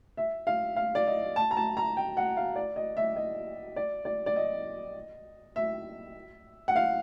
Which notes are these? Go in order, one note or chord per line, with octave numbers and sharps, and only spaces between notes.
E5
F5
F5
D5
D#5
A5
A#5
A5
A#5
G5
F#5
F5
D5
D#5
E5
D#5
D5
D5
D5
D#5
E5
F#5
F5